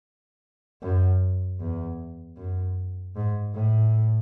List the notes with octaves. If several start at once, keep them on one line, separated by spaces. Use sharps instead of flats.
F#2
E2
F#2
G#2
A2